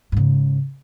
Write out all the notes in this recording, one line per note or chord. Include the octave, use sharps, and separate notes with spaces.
G#2 C#3